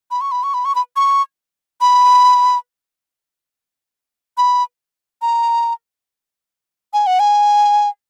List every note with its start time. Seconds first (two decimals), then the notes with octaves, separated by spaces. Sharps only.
0.11 B5
0.21 C#6
0.32 B5
0.43 C#6
0.54 B5
0.65 C#6
0.75 B5
0.96 C#6
1.81 B5
4.38 B5
5.22 A#5
6.93 G#5
7.07 F#5
7.20 G#5